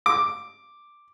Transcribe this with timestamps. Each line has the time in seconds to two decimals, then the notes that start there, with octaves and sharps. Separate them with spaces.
0.06 D6